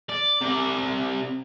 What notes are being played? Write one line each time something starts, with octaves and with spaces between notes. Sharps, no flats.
D5
C3 D5